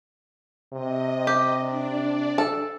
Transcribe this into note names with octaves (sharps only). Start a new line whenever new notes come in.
C3 D#5
G4
D4 D5
A4